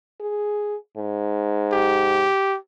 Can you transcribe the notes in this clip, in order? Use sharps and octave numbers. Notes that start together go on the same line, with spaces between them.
G#4
G#2
G4